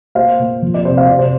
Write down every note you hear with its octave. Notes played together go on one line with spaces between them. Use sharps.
A#3 C5 F5
A#2
F3
D5
C3 C5
C5 F5
C3 D5
C5